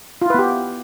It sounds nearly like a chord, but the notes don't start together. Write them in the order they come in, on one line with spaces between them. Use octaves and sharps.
F4 E4 B4 B3 G4